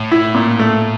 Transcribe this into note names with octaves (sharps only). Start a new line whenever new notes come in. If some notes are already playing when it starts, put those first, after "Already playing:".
Already playing: A2
E4
A#2
A3